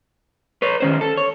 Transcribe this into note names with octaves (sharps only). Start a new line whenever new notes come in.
B4 C#5
D#3 C#4 C5
A4
C#5